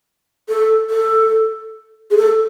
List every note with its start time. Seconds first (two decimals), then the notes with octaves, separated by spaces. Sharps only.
0.49 A4
0.90 A4
2.11 G#4
2.17 A4